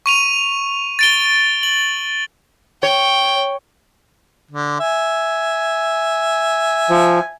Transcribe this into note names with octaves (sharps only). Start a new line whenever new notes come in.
C#6 D#7 F7
A6 D7 G7
F#7
C#5 G5
D3
E5 G#5
F3